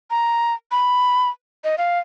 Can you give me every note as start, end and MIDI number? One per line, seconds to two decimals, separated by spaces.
0.11 0.54 82
0.72 1.29 83
1.64 1.75 75
1.78 1.99 77